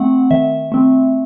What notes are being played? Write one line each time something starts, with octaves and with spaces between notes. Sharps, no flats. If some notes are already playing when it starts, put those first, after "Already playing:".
Already playing: A3 C4 F#5
D#3 E5
A3 C4